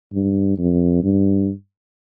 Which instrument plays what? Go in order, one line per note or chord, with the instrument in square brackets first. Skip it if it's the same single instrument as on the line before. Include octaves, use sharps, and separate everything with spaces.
[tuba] G2
F2
G2